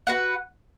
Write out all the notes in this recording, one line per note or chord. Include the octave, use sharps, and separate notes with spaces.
F#4 B4 F#5